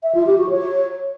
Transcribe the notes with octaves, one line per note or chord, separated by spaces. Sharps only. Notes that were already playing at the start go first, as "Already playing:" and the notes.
E5
F4
G4
F#4
C#5